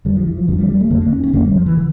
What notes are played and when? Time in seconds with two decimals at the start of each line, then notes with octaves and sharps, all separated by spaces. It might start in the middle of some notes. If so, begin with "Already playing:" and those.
0.05 F2 D3 G3
0.17 F3
0.27 E3
0.37 F3
0.48 F2 D3 F3
0.58 G3
0.69 G3
0.81 A3
0.90 F2 D3 A#3
1.01 A#3
1.13 C#4
1.23 C#4
1.33 F2 D3 A#3
1.44 G3
1.56 F3
1.66 E3
1.77 D3